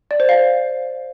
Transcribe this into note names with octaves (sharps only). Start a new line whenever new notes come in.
D5
C5
F5